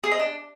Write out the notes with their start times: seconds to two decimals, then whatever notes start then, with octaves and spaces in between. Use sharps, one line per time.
0.04 G#4
0.12 D#5
0.19 D4